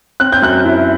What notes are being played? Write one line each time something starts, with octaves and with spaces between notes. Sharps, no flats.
C4 F#6
G6
F#2 F#6
E4